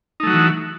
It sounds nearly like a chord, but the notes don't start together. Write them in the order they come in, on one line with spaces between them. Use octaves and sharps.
D#4 A3 F#3 F#4 E3